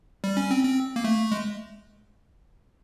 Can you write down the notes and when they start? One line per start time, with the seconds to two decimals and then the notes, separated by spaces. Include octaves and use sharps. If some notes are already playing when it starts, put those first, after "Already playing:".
0.24 G3
0.37 C#4
0.51 C4
0.64 C4
0.96 A#3
1.04 A3
1.32 G#3